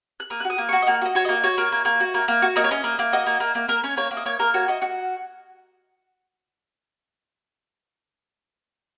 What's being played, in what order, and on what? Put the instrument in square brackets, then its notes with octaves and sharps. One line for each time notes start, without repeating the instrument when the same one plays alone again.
[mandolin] F#6
A#3 D#6
F#6
F#4
D#6
A#3
F#4 C#6
D#5
A#3 F#5
F#4 D#5
F#4 C#5
A#3 D#5
F#4 C#5
A#3
A#3
A#3
F#4
A#3
A#3
F#4
A#3 D#5
C#5
C#4 D#5
A#3
A#3
F#4 D#5
A#3
A#3
A#3
A#3 A#4
C#4 C#5
A#3 C#5
A#3
D#5
A#3 C#5
A#3 A#4
F#4 C#5
F#4 D#5
F#4 F#5